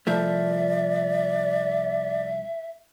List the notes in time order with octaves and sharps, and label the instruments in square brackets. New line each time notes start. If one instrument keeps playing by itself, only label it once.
[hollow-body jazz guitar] C2 F3 A3 [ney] D5 [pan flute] E5